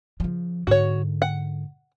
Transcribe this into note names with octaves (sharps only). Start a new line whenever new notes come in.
C#3 F3
G#2 D3 F#4 C#5
F#5